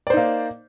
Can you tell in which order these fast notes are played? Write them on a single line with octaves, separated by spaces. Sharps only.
D5 C5 D#4 A#3